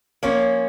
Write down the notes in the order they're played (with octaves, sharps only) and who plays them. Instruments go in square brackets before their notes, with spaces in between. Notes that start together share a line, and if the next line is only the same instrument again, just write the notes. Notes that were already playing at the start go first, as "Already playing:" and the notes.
[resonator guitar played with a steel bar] F3 A#3 C#4 [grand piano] C#5